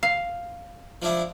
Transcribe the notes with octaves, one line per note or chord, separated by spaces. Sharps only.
F5
F3 D4 E4